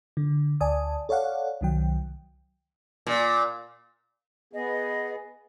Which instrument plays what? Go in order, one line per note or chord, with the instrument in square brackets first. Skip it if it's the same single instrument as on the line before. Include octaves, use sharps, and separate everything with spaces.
[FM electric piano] D3
D2 D5 G#5 A5 D#6
A4 C#5 D5 F5 F#5
C2 D#3 F#3 G5
[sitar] A#2
[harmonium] B3 G#4 [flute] D#5